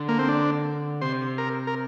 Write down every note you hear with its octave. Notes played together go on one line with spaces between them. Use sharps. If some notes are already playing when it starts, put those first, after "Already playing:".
Already playing: D3
A#3
C4
D4
C3 C5
A#4
A#4